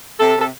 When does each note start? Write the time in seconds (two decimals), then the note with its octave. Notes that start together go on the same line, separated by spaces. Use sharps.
0.20 C3 A4
0.37 C3 A4